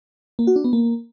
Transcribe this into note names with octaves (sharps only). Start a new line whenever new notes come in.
A#3
F#4
D4
B3
A#3